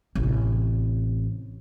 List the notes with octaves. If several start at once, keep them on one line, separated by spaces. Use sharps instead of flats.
A1 C3